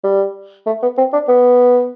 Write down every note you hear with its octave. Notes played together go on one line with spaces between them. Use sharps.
G3
A3
B3
C4
D4
B3